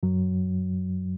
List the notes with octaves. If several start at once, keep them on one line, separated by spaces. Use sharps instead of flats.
F#2 F#3